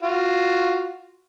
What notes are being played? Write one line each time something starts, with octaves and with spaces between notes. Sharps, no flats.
F4 F#4